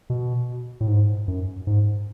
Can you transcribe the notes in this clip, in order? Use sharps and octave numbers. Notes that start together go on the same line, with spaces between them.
B2
A2
G#2
F#2
G#2